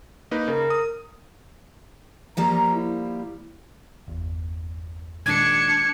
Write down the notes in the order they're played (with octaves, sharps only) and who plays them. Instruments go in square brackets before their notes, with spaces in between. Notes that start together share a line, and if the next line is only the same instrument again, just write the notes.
[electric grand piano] A#3 D#4 B4
[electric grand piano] C#3 [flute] A#4
[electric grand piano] D#6
[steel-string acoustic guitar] F3 G3 A#3 [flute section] A#5
[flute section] E4
[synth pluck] G1 E2
[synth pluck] A#2 D#3 G#3 [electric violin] D4 C#7 [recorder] G#6